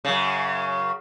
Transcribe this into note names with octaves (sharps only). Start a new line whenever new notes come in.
F#2 C#3